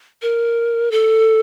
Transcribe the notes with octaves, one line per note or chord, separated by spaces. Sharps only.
A#4
A4